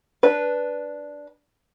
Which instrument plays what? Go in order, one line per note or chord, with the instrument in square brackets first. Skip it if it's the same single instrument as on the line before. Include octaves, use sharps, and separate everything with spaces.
[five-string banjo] D4 B4